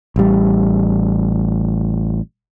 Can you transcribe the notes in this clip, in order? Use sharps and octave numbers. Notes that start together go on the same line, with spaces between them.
A1 G3